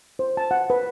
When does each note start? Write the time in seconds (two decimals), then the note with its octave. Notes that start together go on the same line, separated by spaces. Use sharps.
0.19 C5
0.37 A5
0.51 F#5
0.70 B4